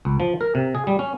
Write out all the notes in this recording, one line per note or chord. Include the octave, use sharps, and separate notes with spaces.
C#2
F3
A#4
C3
G#4
G3
C#4